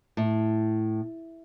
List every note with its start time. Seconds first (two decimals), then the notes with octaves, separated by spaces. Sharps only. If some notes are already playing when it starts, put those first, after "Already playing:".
0.17 A2